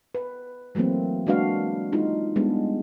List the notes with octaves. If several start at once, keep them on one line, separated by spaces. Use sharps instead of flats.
B4
E3 F#3 A3 A#3 C4
G#3 A#3 D4 F#4 B4 F5
G#3 D#4 F4 G#4
G3 G#3 B3 D4